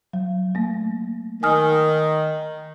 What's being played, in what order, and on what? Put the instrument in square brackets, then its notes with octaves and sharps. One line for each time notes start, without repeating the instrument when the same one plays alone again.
[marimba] F#3
A3 A#3
[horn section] D#3 [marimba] G#5 D#6 F6